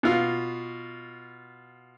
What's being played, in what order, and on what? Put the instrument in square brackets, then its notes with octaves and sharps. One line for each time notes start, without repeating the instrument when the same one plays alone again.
[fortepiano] B2 F4